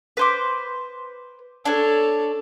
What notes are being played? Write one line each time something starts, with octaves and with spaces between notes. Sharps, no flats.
B4 C5 D6
D4 A4 C#5